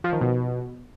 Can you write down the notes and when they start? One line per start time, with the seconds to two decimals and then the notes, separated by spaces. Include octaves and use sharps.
0.04 F3
0.13 D#3
0.21 B2